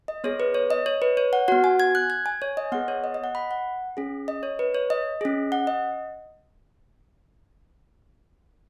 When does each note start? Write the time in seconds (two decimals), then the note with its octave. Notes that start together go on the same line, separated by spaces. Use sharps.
0.08 D#5
0.24 B3 G#4 C#5
0.40 B4
0.54 C#5
0.70 D#5
0.86 C#5
1.02 B4
1.17 C#5
1.33 F#5
1.48 B3 F#4 F#5
1.64 G#5
1.80 G#6
1.95 F#6
2.10 G#6
2.26 G#5
2.42 C#5
2.57 D#5
2.72 B3 G#4 F#5
2.88 C#5
3.04 D#5
3.14 D#5
3.24 F#5
3.35 B5
3.51 F#5
3.97 C#4 G#4
4.28 D#5
4.43 C#5
4.59 B4
4.74 C#5
4.90 D#5
5.21 C#4 G#4
5.52 F#5
5.67 D#5